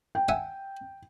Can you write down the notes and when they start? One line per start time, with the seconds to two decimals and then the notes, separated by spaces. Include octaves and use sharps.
0.15 G5
0.29 E5 F#5 G#5